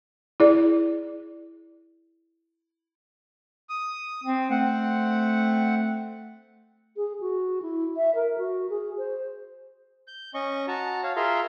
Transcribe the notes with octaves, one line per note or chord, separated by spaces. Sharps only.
E4 G#4 D5
D#6
C4
A3 C4 F#5
G#4
F#4
E4
E5
A#4
F#4
G#4
C5
G6
C#4 D#5 C#6
F#4 A5 A#5
C#5 F5
F4 G#4 A#4 E5 A#5 C6